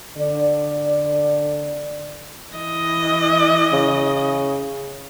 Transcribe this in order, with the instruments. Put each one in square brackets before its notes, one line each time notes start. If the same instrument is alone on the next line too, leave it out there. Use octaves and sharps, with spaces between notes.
[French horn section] D3 D5
[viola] E3 D#5
[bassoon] C#3